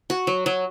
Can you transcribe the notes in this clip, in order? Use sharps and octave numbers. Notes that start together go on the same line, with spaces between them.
F#4
F#3
F#3